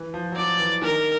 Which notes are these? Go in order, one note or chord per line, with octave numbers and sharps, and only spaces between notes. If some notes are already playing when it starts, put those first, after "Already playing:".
Already playing: E3
F3
F#3
F3 D5
E3
D#3 A#4